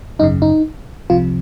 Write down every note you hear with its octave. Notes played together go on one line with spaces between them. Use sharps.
G#1 F#2 C#3 D#4
D#4
C2 C3 F3 F4